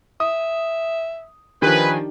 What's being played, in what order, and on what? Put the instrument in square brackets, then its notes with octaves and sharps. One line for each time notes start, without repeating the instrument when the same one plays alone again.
[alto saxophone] E5 [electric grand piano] D#6
[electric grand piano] D#3 F3 [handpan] D4 D#4 G4 [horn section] B4 [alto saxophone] G#5